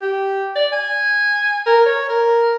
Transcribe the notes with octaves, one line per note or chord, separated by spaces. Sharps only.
G4
D5
G#5
A#4
C#5
A#4